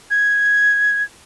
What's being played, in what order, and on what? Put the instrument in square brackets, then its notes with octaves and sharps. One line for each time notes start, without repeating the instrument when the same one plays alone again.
[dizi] G#6